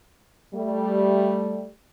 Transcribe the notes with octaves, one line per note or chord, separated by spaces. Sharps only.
G3 A3